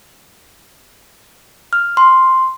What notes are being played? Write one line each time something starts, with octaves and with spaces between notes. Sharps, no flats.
F6
C6